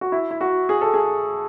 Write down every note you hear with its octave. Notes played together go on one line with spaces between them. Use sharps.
F#4
E4
E4
F#4
G#4
A4
G#4